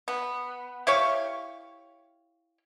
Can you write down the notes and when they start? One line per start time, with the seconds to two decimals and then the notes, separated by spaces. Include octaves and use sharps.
0.08 B3
0.87 E4 G4 C#5 F5